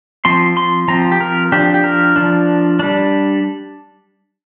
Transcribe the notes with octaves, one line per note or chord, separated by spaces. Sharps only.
F3 C4 C6
C6
F3 C4 A#5
G4
A#4
F3 D4 G4
G4
A#4
F3 D4
G3 D4